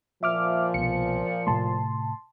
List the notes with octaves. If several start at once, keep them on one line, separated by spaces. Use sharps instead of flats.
A#2 F3 E5 D6 F6
C2 B2 C#7
A2 C3 A3 A5 C6